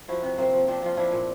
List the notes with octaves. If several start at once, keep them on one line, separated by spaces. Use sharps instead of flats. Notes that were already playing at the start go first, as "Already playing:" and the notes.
F3 E4 F#4
C3
C3 A#3 C4
F3
F3 C4 D4
F3 F4
F3 D4 E4
A#2